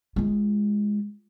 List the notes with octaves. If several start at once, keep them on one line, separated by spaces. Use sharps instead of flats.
G#3 F4